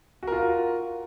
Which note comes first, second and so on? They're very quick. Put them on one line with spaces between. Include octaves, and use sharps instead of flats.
F#4 A#4 F4